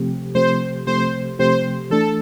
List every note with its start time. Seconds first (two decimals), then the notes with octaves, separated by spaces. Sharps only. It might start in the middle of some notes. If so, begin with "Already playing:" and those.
Already playing: C3 F3 A3 C4 G4
0.35 C3 F3 A3 C4 G4 C5
0.87 C3 F3 A3 C4 G4 C5
1.39 C3 F3 A3 C4 G4 C5
1.90 E3 A3 D4 A4